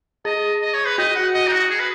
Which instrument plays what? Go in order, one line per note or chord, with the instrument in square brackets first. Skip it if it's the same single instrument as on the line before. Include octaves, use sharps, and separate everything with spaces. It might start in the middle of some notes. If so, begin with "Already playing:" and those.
[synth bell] G#4 [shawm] D#5
[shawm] D#5
C#5
B4
[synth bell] F#4 [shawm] D#5
[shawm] F#5
D#5
D#4
F#4
G#4
B4